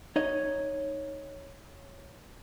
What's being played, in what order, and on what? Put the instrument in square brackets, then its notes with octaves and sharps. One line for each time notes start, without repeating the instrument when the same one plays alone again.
[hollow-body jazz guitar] D#4 C#5 D#5